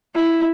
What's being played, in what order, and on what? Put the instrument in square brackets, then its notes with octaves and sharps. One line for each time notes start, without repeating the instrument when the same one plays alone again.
[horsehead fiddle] E4